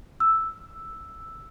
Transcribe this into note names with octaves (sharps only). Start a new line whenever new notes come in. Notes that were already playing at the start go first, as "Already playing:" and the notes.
E6